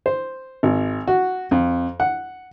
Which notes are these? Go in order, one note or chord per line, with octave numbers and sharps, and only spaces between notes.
C5
G#1
F#4
F2
F#5